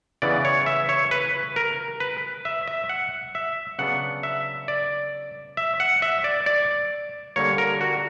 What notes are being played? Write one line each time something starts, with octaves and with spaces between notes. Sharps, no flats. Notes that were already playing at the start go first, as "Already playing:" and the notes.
C#3 E3 B3 D5
C#5
E5
C#5
B4
A#4
B4
E5
E5
F#5
E5
C#3 F#3 B3 D4 F#5
E5
D5
E5
F#5
E5
D5
D5
D3 G3 A#3 C#5
A#4
F#4